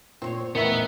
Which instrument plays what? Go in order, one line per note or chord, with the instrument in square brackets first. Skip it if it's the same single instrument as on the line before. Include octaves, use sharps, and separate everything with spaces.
[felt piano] A#2 [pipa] C4 C5 C#5
[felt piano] A1 E2 [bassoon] D#3 [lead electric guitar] B3 [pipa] G#4 E5